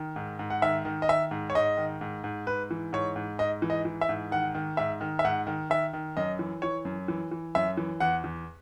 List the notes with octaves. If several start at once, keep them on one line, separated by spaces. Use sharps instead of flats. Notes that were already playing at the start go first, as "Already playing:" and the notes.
Already playing: D#3
G#2
G#2
F#5
D#3 E5
D#3
D#5
D#3 E5
G#2
C#5
G#2 D#5
D#3
G#2
G#2
G#2 B4
E3
G#2 C#5
G#2
G#2 D#5
E3
D#5
E3
E5
G#2
D#3 F#5
D#3
G#2 E5
D#3
E5
G#2 F#5
D#3
D#3 E5
D#3
F#2 D#5
E3
E3 C#5
F#2
E3
E3
F#2 E5
E3
E2 F#5
E2